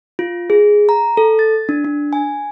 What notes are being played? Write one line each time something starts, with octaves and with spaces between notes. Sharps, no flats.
F4
G#4
A#5
A4
A6
D4
D4
G#5